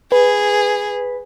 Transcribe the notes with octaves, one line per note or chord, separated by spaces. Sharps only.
G#4 B4